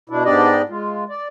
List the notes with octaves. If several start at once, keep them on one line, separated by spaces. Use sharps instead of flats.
B2 D4 E4
G#2 B3 D4 G4 D5 D#5
G#3 F4
D5